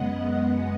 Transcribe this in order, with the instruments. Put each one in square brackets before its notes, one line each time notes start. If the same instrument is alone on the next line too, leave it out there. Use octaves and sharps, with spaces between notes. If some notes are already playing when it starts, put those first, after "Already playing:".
Already playing: [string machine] F#2 C#3 G#3 B3 D#5 F#5